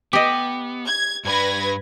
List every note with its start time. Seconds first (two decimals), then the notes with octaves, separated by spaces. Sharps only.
0.13 B3 G4 D#5
0.87 G#6
1.25 G2 D4 B4 G#6 A#6